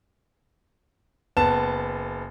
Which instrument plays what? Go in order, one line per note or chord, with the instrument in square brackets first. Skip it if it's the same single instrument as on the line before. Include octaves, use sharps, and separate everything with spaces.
[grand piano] F#1 B3 A5 E7